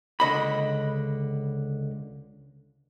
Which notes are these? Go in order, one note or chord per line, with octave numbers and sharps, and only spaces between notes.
C#2 D3 D#5 B5